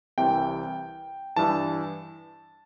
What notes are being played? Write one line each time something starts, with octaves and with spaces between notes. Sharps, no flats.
C2 C3 E3 G5
G2 E3 A5